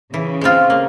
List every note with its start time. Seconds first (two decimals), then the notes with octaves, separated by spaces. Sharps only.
0.13 C#3 E3
0.41 G#3 C4 F4
0.70 A#3